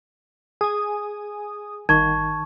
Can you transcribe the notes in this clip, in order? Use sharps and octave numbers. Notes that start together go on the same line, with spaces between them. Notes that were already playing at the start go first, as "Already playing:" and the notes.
G#4 G#5 D#6
G1 D#3 A5 C#6 G#6